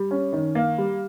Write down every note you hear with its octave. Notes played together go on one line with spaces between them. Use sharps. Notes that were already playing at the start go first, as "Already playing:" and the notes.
Already playing: G3
C#4
D#3
A#3
G3